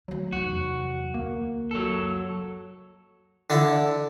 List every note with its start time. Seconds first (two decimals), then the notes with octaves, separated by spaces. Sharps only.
0.08 D3 F#3 A3
0.33 F1 E2 F#4
1.14 D2 A#3
1.71 F#1 C#2 F#3 A4
3.50 D3 D4 E4